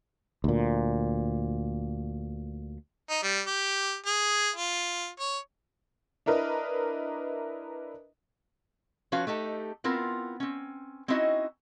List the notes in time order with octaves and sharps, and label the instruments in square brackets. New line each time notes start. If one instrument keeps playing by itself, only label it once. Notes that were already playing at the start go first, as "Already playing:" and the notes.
[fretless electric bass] D2 A#2
[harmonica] D#4
G3
G4
G#4
F4
C#5
[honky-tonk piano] D4 E4 A#4 B4 D#5
[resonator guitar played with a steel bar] F3 C#4 F#4 B4 C#5 F5
A3 D#4 G4 A4
B3 C4 E4 F4 A#4
C4 C#4
C4 C#4 D#4 E4 F#4 D#5